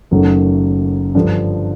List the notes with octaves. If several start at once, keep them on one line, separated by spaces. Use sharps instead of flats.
F#1 F#2 D#3 F#3 A3
G2 D3 F3